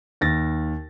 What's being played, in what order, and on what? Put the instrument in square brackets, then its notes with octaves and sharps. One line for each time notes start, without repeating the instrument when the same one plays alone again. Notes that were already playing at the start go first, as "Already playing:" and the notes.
[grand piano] D#2 A6 A#6